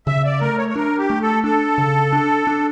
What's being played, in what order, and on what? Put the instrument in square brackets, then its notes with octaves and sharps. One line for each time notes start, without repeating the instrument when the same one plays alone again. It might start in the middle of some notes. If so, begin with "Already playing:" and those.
[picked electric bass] C#3 [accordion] E5
[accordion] D5
[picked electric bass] A3 [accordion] A#4
[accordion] C#5
C#5
[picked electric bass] D4 [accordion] A#4
[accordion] G4
[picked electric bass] A3
[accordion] A4
[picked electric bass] D4 [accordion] A4
[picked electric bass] C#3
D4
D4